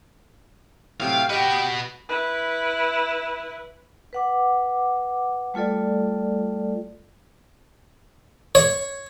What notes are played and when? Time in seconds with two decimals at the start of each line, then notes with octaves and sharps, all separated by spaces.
1.00 A2 C3 F#3 F5 G5
1.29 F#4 G4 B4 D#5 G5 C#7
2.09 E4 B4
4.13 B4 F#5 D6
5.54 G3 A3 F4 A4 D5
8.55 C#5